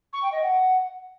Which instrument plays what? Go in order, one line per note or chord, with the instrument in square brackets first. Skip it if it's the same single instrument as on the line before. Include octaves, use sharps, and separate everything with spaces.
[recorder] C#6
G5
D#5
F#5